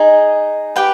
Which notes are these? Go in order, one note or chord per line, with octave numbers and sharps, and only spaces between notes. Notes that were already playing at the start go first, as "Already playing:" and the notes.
Already playing: D#4 G#4 D#5 G#5
G4 B4 G5